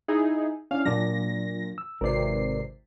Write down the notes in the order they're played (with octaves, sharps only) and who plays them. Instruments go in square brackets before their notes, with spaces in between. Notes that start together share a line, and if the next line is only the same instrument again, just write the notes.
[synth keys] D#4 E4 G#4
[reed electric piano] C#4 D4 E4 [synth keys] F5
[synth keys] A#2 A#6 [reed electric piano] F#3 D4 F4
[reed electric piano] E6
[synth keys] G#1 C3 C7 [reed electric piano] A#4 B4 D5